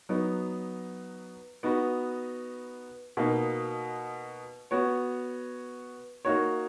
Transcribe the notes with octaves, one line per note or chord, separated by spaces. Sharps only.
F#3 B3 D#4
B3 D#4 F#4 B4
B2 A#3 D#4
B3 F#4 C#5
A#3 D#4 F#4 C#5